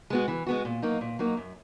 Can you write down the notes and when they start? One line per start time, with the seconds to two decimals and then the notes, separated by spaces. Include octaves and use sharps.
0.10 G#3 B3 F#4
0.28 E3
0.46 G#3 B3 F#4
0.65 A#2
0.82 F#3 A#3 D#4
1.01 A#2
1.19 F#3 A#3 D#4
1.37 F#2